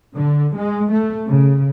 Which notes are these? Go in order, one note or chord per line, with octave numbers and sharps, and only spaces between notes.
D3
G#3
A3
C#3